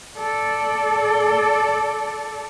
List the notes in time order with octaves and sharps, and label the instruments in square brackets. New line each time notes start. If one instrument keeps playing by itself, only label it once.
[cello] A4 D5